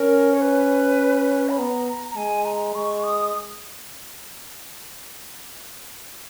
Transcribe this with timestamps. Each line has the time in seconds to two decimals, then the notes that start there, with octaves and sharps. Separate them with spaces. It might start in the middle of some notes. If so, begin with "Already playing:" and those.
Already playing: C#4 A#4
0.33 C#5
0.41 B4
1.49 B5
1.58 B3 A#5
2.11 A#5
2.16 G#3 G#5
2.45 A#5
2.74 G#3 C#6
3.04 D#6